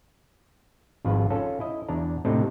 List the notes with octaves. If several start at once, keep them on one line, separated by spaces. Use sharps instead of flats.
G#1 F2 G#2 F4 B4
C#4 F4 A4
E4 D#5
E2 D4 A#5
A2 C3 A3 C4 D4 D#4